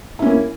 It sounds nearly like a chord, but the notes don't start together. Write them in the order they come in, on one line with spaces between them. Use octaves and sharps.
E4 C#4 A#3